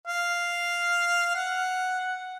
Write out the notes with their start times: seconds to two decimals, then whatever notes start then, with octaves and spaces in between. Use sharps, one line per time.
0.07 F5
1.35 F#5